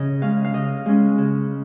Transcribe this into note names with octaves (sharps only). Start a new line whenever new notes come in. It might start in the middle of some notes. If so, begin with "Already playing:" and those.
Already playing: C#3 D#5
G#3 C#4 F5
F5
C#3 D#5
G#3 C#4
C#3